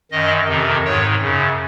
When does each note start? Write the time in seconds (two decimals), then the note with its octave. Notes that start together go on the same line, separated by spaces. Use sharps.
0.11 F#2 D#3 D#5
0.48 F2 C3 D#3
0.84 G#2 D#3 C#5
1.20 F#2 C#3